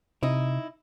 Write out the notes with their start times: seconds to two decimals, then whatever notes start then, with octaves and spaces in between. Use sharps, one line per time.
0.23 C3 D#4 E4